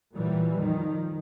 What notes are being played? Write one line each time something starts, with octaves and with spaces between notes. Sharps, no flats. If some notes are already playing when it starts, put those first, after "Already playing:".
A#2 E3 F#3 G3
F2 D#3 F3